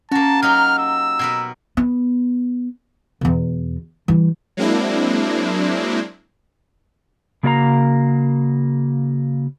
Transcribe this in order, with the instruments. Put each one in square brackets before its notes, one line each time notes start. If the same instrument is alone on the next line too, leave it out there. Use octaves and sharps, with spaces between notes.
[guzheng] A#3 F#4 [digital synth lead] C#4 [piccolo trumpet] A5
[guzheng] F#3 D#4 G4 [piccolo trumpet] F6
[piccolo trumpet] E6
[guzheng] B2 A#4 B4
[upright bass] B3
E2 B2
E3 G3
[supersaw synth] F#3 G#3 A#3 C4 D4 E4
[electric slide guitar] C#3 A#3 F#4 D5 F5 A#5